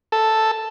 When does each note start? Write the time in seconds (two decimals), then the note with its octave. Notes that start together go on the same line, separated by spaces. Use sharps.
0.12 A4